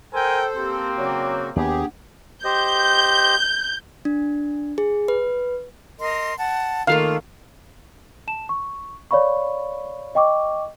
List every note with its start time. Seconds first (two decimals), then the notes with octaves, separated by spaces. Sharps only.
0.13 A4 A#4 C5 G5 G#5 C6
0.56 A#3 C4 G4 C6
0.98 C#3 F#3 F#4 C#5 D5 D6
1.56 D#2 A#3 B3 D4 G4 G#4 F#5
2.44 G4 C5 D#5 G6
4.05 D4
4.78 G#4
5.08 B4
5.99 A#4 D#5 C6
6.37 F#5 A5
6.87 D#3 A3 A#3 F4 F5
8.28 A5 E7
8.49 C#6
9.11 C#5 D5 F5 B5 C#6
10.15 D#5 G5 C#6 D6